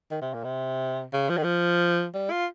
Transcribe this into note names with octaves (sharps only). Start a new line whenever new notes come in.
D#3
C3
A#2
C3
C#3
F3
D#3
F3
G3
F4